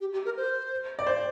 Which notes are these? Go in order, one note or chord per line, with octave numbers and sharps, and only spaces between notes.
G4
G4
A#4
C5
D5
C5